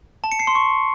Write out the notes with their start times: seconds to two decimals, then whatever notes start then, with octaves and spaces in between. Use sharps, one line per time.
0.24 A5
0.32 C#7
0.39 C7
0.47 C6
0.55 C#6